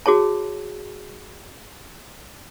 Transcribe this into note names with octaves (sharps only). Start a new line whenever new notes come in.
F#4 G#4 C#5 A5